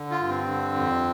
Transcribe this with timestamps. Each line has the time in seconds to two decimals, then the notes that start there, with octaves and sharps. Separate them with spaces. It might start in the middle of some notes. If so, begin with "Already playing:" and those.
Already playing: D3
0.11 F4
0.20 G2
0.29 C4
0.48 D3
0.76 F2